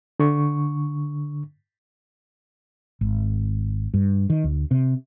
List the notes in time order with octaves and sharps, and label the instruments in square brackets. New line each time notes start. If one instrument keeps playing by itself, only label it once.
[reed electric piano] D3 C#6
[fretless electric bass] G#1
G2
D#3
D2
C3